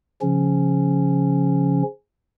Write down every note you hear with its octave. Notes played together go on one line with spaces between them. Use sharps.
C#3 F3 C#4